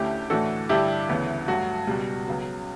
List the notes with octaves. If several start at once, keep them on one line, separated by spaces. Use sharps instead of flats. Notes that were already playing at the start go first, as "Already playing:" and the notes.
Already playing: D2 D3 A3 C#4 E4 G4
A2 E3 A3 D4 F#4 A4
G2 D3 G3 D4 E4 G4
D2 C#3 E3 B3
G2 F#3 A3 F#4
C#2 B2 G3
C#2 C#3 F#3 B3